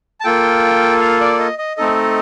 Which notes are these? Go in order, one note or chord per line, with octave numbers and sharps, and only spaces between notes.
A5
A#3 F4 A4 G5
F5
D5
D#5
D#5
A3 C4 D#4 A4 D#5